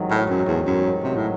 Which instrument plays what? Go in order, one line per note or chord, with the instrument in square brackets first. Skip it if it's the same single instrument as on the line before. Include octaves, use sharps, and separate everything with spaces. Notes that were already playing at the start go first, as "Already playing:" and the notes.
Already playing: [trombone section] A1 G#2 D#3 F#3
[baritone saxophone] A2
F#2
E2
F#2
C3
A2